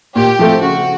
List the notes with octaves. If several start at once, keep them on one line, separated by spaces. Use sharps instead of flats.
A#2 G4
F3 A3 C4
C#3 F#4